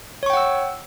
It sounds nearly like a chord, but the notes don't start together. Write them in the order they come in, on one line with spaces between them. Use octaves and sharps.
C#5 C#6 G5 F#5 E6